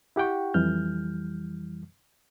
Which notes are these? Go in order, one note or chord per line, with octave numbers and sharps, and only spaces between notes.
E4 G4 F#5 G5 C#6
F2 E3 G3 F6 G6